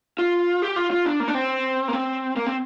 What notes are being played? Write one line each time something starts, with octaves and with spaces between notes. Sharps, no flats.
F4
G4
F4
F4
D4
A#3
D4
C4
A#3
C4
A#3
C4